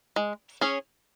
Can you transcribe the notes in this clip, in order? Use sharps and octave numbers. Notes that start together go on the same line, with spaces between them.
G#3
C#4 G#4 C#5